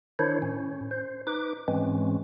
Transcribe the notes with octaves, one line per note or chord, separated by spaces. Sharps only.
D#3 D4 E4 C5 C#5
A2 C#4
C5
D#4 B4 D6
G#2 E3 G#3 C4 C#4